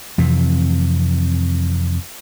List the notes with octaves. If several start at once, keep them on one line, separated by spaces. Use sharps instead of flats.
F2 C3 E3